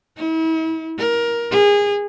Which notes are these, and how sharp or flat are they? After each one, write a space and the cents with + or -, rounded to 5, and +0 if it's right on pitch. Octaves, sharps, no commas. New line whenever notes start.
E4 -40
A#4 +15
G#4 -25